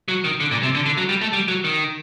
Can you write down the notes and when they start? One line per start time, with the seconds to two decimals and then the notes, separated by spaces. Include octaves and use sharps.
0.08 F#3
0.24 D#3
0.40 D3
0.51 A#2
0.63 C3
0.75 D3
0.86 D3
0.97 F#3
1.09 G3
1.21 A3
1.33 G3
1.48 F#3
1.64 D#3